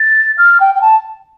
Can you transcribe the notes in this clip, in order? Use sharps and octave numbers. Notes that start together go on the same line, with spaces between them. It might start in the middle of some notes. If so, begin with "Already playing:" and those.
Already playing: A6
F6
G5
G5
A5